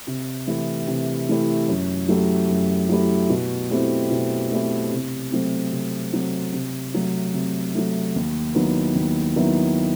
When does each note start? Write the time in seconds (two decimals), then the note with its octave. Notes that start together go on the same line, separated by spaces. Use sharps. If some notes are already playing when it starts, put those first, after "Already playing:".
0.07 C3
0.47 E3 A3 E4 G4
0.88 C3
1.29 E3 A3 E4 G4
1.68 F#2
2.08 F#3 A3 E4 G4
2.50 F#2
2.89 F#3 A3 E4 G4
3.29 B2
3.70 A3 C4 E4 G4
4.11 B2
4.52 A3 C4 E4 G4
4.92 C3
5.31 F#3 A3 C4
5.72 C3
6.13 F#3 A3 C4
6.53 C3
6.94 F#3 A3
7.34 C3
7.75 F#3 A3
8.15 D#2
8.55 D#3 F#3 B3 E4
8.95 D#2
9.36 D#3 F#3 B3 E4